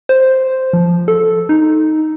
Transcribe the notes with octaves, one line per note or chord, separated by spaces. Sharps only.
C5
F3
A4
D#4